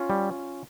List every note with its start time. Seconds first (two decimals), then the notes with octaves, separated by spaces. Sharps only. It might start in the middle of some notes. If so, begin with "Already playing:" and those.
Already playing: C#4 F4
0.10 G3